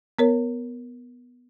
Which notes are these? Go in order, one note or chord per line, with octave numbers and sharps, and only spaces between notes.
B3 A#4 C#5